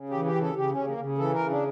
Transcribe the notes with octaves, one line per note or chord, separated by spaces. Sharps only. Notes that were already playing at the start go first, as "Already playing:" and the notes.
Already playing: C#3
E3 G4
G4
C#3
A4
C#3 G4
C#3 C#4
A#3
C#3
E3 A4
A#4
C#3
D4